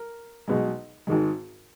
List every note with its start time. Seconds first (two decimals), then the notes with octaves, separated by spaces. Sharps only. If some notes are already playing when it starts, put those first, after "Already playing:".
Already playing: A#4
0.48 B1 B2 G#3
1.07 G#1 G#2 D#3 G#3